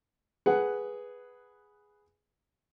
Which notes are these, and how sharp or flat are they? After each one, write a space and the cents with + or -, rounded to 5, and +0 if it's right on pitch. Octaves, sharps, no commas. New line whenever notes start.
G#4 +0 B4 +0 F#5 +10